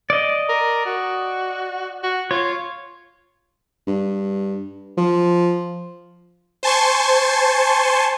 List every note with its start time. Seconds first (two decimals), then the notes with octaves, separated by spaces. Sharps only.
0.10 D5 D#5
0.49 A#4
0.86 F#4
2.03 F#4
2.31 F4 C#5
3.87 G2
4.97 F3
6.63 C5 G#5 A5 C6 C#6